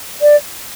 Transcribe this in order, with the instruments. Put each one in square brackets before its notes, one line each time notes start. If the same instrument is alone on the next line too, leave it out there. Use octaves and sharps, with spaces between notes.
[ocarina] D5